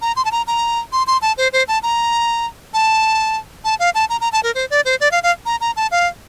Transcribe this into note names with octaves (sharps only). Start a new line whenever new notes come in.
A#5
C6
A5
A#5
A#5
C6
C6
A5
C5
C5
A5
A#5
A5
A5
F5
A5
A#5
A#5
A5
A#4
C5
D5
C5
D5
F5
F5
A#5
A#5
A5
F5